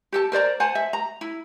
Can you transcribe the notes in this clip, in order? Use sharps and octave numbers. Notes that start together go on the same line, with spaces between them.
G4 A4 A5
A#4 C5 D5 A#5
C5 F#5 G#5 A5
E5
A#5
E4